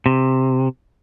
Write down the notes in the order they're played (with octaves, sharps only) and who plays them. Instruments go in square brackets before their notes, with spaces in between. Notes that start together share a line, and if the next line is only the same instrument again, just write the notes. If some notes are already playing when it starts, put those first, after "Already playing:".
[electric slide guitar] C3